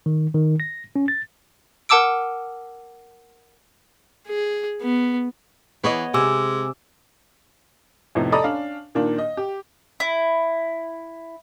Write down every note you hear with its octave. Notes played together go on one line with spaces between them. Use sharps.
D#3
D#3
A#6
C#4
A6
A#4 F#5 A5 D6 E6 D7
G#4
B3
E3 B3 C#5 D#5
C3 G#3 G#5 D6 E6
F2 A2 C3 B3 D#4
A4 D5 D#5 A#5 B5 D#6
C#4 D4 F5
A#2 D#3 A#3 D4
D#5
G4
E4